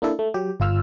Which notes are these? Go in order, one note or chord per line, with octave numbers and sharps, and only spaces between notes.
A#3 D4 E4 A4
A3
F#3 G4
G1 F4 E6 F6